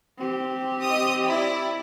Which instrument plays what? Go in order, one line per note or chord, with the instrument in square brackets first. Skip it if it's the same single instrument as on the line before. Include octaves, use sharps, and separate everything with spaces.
[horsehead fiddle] C4 G4
[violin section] D#5 D#6
E4 D5